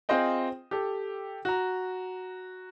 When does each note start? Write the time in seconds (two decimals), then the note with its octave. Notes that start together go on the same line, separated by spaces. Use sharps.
0.09 C4 F4 G#4 C5 D#5 G5
0.71 G4 A4
1.45 F#4 A#5